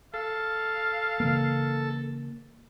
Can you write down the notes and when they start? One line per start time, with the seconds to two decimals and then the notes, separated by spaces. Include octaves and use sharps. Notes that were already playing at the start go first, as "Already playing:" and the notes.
0.14 A4 F5
1.20 C#3 E3 A#3